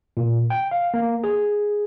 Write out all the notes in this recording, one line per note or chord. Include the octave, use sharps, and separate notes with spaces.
A#2
G5
F5
A#3
G#4